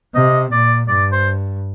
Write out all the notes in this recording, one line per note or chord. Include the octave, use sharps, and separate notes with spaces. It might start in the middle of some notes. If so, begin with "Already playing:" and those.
C3 D#5
A#2 D5
G2 D5
C5